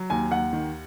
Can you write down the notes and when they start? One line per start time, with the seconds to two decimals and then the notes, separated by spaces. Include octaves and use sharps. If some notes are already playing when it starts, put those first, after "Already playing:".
Already playing: F#3
0.10 D#2 G#5
0.31 D#2 F#5
0.53 D#3